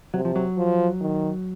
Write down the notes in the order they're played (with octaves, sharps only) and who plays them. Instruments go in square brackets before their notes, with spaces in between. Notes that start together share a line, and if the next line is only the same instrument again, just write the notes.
[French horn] C3 [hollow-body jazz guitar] F#3
[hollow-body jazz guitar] F3
F#3
[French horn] F3
D#3